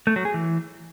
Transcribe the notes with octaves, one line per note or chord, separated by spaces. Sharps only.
A3
F#3
G#4
E3